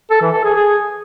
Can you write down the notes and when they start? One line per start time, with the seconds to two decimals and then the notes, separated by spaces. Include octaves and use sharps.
0.10 A4
0.22 E3
0.33 A4
0.44 G#4
0.55 G#4